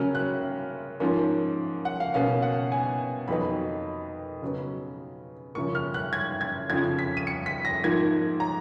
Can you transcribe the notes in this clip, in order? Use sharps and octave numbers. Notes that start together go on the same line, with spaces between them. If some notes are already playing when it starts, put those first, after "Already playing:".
Already playing: C#3 F#3 A#3 C#4 F6
F#6
G#2 F3 A#3 C#4
F#5
F5
B2 A#3 C#4 F5
F#5
G#5
F2 D#3 F#3 B3 D#4 B5
C#3 F#3 B3
F#2 C#3 F3 A#3 C#6
F6
F#6
G#6
G#6
F2 C#3 F3 G#6
B6
D#7
C#7
B6
A#6
G#2 F3 A#3 G#6
A#5